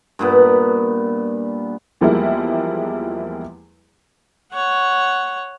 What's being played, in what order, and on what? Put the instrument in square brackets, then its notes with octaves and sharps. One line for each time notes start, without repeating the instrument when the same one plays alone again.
[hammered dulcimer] G2 A#2 B3
[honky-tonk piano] E2 F3 G3 G#3 A#3 E4
[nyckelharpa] C#5 F#5